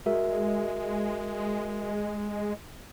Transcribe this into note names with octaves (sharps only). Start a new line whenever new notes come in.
G#3 F#4 A#4 E5